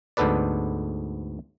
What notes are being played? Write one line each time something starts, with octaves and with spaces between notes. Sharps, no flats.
D2 G#2 B3 A4 B4 D5